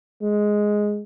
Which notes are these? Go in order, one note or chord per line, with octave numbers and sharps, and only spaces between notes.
G#3